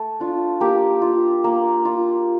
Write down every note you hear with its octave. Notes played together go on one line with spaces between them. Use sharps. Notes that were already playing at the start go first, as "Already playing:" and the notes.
Already playing: A3 A4
D4 F4
A#3 G4
F4
A#3
F4